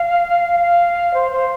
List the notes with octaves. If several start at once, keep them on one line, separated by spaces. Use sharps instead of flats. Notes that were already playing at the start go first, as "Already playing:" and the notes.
Already playing: F5
F5
C5
C5